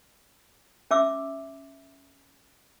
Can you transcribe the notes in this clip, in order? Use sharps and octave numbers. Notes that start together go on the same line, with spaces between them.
C#4 E5 D6 E6